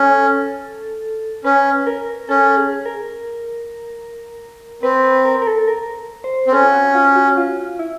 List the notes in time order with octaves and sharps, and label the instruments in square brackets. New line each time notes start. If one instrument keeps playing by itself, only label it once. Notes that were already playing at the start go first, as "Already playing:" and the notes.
Already playing: [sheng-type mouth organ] C#4 [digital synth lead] A4
[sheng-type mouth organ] C#4 [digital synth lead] B4
[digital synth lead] A#4
[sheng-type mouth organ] C#4 [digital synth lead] A4
[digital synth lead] G#4
A#4
[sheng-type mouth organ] C4 [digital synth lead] B4
[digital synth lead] B4
A#4
A#4
A4
A#4
C5
[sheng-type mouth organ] C4
[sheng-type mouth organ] C#4 [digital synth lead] A4
[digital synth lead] F4
F#4
F4
F#4
F4
E4